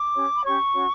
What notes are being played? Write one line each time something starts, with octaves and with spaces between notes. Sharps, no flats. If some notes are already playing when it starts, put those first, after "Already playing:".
Already playing: D6
C#4 G4 C#5
B5
C#4 G4 C#5 C#6
C#4 F#4 C#5